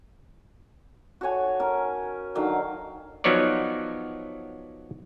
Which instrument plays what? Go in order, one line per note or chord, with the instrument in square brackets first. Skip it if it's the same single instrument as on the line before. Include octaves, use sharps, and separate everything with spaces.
[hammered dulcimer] F#4 A4 C#5 G#5
C#4 A#4
D3 D#3 F#3 F5
[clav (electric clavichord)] F3 F#3 B3 D#4 C#5 D5